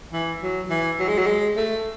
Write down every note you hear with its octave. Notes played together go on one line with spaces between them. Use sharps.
E3
F#3
E3
F#3
G#3
F#3
G#3
A3